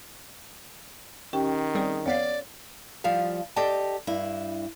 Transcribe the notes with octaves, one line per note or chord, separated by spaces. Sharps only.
D#3 C#4 G4 G5
G3 C4 G#4
F2 B3 C#5 D5 F5
F3 G3 F5
G4 A4 D5 D#5 G5 A5
G2 E4